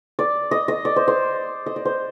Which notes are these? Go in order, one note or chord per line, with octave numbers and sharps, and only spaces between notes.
D5
D#5
D#5
D5
C5
C5
D#5
D5
C5